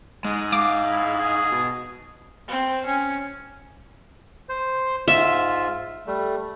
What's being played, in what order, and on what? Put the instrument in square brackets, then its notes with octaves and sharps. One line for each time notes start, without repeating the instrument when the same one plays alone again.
[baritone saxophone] G#2 [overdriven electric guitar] G#3
[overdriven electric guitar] F5 [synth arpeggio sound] D6
[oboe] E4
G#4
[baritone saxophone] B2
[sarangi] C4
C#4
[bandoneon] C5
[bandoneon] G#2 F4 [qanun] E5
[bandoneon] G3 A3